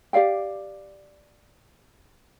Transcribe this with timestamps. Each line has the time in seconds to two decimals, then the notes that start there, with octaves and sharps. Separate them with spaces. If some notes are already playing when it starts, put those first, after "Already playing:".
0.13 G4 D5 F5 G5